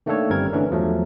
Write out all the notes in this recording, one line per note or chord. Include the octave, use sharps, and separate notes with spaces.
D#3 A3 A#3 D4 A4 C#5
G1 G3 C4 C#4 A#4 G#6
D3 E3 A3 C#4 D4
E2 F3 F#3 A3